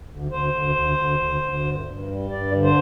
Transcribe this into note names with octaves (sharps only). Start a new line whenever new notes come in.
D2
D2 C5
D2
D2
D2
D2
D2
G2
G2
G3
G2 D5
D3
C5